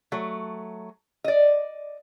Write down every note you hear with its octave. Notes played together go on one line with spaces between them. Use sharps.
F#3 A3
D5 D#5